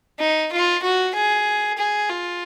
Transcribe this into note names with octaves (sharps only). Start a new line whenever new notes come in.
D#4
F4
F#4
G#4
G#4
F4